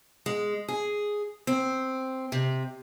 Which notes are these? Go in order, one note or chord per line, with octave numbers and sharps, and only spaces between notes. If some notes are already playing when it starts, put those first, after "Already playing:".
G#3
G#4
C4
C3